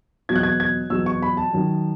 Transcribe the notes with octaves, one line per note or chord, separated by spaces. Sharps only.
E2 B2 F#3 G#6
F#6
G#6
G#6
E2 B2 F#3 E6
C#6
B5
A5
F#2 D#3 F#3